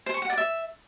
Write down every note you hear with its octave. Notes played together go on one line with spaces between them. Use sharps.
C5
C#6
F#5
D5
E5